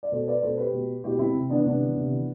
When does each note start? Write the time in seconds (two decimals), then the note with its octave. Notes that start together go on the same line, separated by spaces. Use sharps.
0.03 D5
0.12 B2 A4 C5
0.28 B4 D5
0.43 B2 A4 C5
0.58 G4 B4
0.73 B2
1.04 B2 E4 G4
1.19 C4 E4
1.35 C3
1.50 E3 B3 D4
1.65 C3 B3 D4
1.80 E3
1.96 C3
2.12 E3